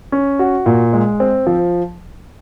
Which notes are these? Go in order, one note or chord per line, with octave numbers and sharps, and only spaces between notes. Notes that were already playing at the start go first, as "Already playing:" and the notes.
C#4
F#4
A#2
G#3
C4
F3